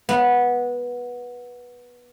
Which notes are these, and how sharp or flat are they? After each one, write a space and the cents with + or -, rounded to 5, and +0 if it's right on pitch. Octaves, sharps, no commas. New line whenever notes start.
B3 -15